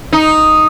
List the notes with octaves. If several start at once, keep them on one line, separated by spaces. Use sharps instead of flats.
D#4